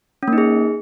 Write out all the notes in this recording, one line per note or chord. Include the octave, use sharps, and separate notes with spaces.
C#4
A#3
D#4
G#4